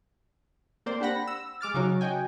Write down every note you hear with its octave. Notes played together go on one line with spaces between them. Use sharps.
A#3 C4 C5 D5
D4 G4 C5 F#5 B5 A#6
E6
G#3 D6 F6 A6
C#3 F#3 C#4 D#4 F#4 C#5
F#4 D#5 G5 G#5